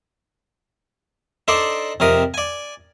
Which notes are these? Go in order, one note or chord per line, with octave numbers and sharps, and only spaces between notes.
D4 D#4 A4 C5 D5
F2 C3 A#4 D#6
D5 G#5